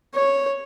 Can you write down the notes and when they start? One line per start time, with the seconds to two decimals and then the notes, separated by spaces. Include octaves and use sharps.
0.15 C#5